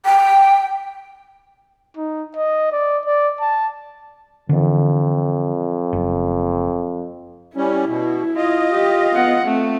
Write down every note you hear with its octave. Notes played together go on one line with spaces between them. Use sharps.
G5
D#4
D#5
D5
D5
A5
F2 D3 E3
F#1
G3 C#4 E4
B2
F4 D#5
G4
B3 F#5
A3 C4